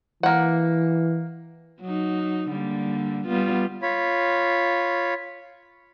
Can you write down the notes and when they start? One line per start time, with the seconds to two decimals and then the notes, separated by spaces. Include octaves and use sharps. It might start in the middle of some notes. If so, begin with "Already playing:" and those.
0.23 E3 A#3 F#5
1.81 F#3 D#4
2.50 D3 G3 A#3
3.27 G3 B3 F4
3.82 F4 C#5 B5